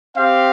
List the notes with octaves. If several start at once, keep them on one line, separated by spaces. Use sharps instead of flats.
C4 G4 F5